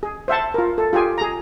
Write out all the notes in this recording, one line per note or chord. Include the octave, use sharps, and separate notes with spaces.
G#4
C5 E5 F#5 A5
F4 A#4
A4
F4 G4 G#4 G#5
G#4 A#5